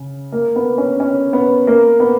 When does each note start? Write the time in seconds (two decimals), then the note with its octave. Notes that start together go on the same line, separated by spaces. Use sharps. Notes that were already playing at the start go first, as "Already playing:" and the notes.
Already playing: C#3
0.32 A#3
0.56 B3
0.78 C#4
1.00 C#4
1.33 B3
1.67 A#3
2.00 B3